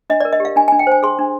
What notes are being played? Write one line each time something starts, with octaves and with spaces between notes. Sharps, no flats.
D4 D#5
A#4 D5
D#5
G4 F5
D4 G#5
D4 G#5
G5
C5 G#5
G#4 C6
D4